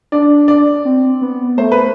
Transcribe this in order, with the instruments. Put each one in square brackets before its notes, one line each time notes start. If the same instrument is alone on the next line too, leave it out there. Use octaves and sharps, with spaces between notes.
[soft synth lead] D4 [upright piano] D5
[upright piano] D5
[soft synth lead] C4
B3
[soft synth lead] A3 [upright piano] C5
[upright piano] B4